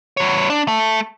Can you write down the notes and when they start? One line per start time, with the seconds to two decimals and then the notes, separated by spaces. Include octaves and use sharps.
0.17 E2 C#5
0.50 D4
0.68 A3